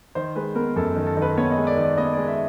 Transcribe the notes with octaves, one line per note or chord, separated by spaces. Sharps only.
D#3 C5
G#3 B4
B3 A#4
F#2 A4
D#3
A4
D#3 B4
B3 C#5
D#5
G#3
D5
D#3
D5
B3 D#5
G#3 D5
E5